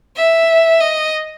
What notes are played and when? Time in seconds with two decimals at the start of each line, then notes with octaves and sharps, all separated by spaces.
0.16 E5
0.81 D#5